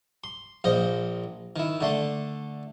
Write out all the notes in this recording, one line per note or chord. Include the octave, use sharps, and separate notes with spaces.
C6
A#1 A#2 C5 D#5
D#3 E4
D3 A3 C6